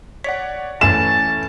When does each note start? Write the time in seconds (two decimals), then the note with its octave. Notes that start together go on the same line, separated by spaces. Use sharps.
0.24 C#5 D5 F#5 B6
0.81 E3 A3 C#4 G#5 A5 E7